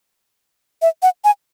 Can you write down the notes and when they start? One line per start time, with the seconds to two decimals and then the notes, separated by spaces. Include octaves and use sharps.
0.82 E5
1.03 F#5
1.24 G#5